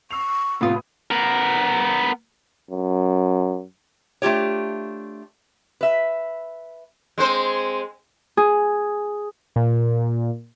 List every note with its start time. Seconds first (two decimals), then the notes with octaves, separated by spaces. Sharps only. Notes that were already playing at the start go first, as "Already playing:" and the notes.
0.11 C#6 E6 C7 F7
0.61 A2 C3 B3 F4 D#6
1.11 B3 A#4
2.71 F#2
4.22 A3 D4 F4 G4 C#5
5.81 B4 E5
7.18 G#3 C4 C5
8.37 G#4
9.56 A#2